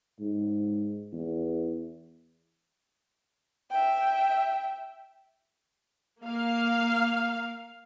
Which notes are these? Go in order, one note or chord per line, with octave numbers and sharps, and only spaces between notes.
G#2
E2
E5 G5
A#3 F5